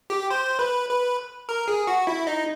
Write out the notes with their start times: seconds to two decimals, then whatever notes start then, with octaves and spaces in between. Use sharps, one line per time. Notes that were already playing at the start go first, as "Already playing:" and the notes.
0.10 G4
0.30 C5
0.59 B4
0.90 B4
1.49 A#4
1.68 G#4
1.87 F#4
2.07 E4
2.27 D#4